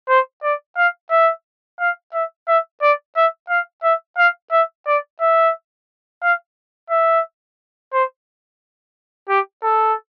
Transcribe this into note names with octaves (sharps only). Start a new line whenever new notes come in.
C5
D5
F5
E5
F5
E5
E5
D5
E5
F5
E5
F5
E5
D5
E5
F5
E5
C5
G4
A4